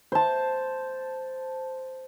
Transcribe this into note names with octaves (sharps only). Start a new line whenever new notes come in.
C5 A5